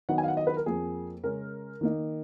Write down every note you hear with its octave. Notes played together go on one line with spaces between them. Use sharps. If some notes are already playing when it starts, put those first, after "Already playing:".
D#3 F#3 B3 D#4 F#5
G#5
F5
F#5
D#5
B4
A#4
F2 F3 A#3 G#4
C#3 G#3 C#4 A#4
D#3 A#3 D#4